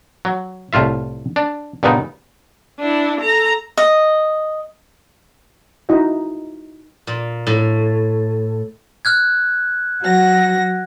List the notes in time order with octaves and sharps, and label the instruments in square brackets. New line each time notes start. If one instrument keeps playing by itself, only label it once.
[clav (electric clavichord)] F#3
C2 A2 F4 E5
D4
G2 A#2 C#3 B3 D#4
[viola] D4 E4
A4 A#5
[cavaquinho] D#5
[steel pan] D#4 E4 F#4 D#5 E5
[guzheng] A#2
A2
[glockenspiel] F6 F#6 G#6
[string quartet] F#3 F#4 A#6